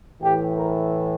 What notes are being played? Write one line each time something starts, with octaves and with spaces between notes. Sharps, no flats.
A2 E3 G4
A#4